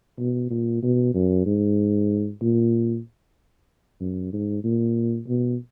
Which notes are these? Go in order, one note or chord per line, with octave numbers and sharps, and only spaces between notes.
B2
A#2
B2
F#2
G#2
A#2
F#2
G#2
A#2
B2